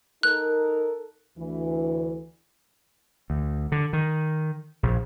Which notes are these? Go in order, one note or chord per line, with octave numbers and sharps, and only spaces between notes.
D#4 A4 A#4 F#6
D2 E3
D2
D3
D#3
A#1